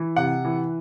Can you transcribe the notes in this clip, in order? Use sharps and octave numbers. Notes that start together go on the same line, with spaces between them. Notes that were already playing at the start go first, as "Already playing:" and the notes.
Already playing: E3
C3 F#5
E3